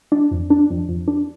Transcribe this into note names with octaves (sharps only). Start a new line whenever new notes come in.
D4
F2
D4
F2
F2
D4